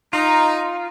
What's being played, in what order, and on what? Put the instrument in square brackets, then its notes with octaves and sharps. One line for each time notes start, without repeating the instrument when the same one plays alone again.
[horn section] D#4 [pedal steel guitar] F4